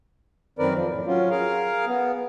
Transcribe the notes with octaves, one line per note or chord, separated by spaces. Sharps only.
F#2 D#3 C4 A#4 B4 D5
F2 F3
A2
F#3 C#4 F4
G#4 A#4 F5
B3